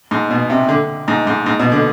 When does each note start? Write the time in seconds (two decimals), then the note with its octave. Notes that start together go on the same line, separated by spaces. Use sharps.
0.11 G#2
0.31 B2
0.50 C3
0.69 D3
1.08 G#2
1.27 G#2
1.46 G#2
1.60 B2
1.72 D3